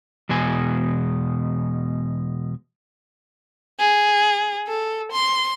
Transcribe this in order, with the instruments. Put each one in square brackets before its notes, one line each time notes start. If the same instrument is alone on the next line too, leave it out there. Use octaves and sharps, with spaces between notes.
[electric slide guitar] E2 B2 G#3 G#5
[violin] G#4
A4
C6